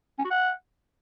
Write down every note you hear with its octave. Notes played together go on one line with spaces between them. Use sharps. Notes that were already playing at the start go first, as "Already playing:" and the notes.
C#4
F#4
F#5